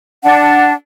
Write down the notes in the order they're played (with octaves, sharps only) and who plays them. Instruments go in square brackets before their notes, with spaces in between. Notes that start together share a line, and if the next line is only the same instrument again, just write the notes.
[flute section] D4 F#5 A5